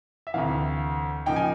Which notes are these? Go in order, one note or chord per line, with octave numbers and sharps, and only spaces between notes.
E5
D2 C3 E3 F5
C#3 F3 A#3 D#4 G5
G#5